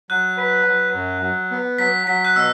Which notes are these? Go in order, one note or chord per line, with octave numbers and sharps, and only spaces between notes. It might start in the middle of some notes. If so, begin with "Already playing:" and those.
F#3 F#6
B4
F#3
F#2
F#3
B3
F#3 B6
F#3 B6
F#6
B2 E6